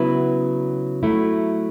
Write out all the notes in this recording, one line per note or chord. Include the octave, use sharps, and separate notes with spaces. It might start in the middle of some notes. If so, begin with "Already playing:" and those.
Already playing: C#3 F#3 B3 E4 B4
F#3 A3 E4